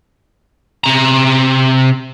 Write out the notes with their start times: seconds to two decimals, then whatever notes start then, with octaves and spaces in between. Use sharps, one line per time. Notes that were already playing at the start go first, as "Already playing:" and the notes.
0.84 C3 A#5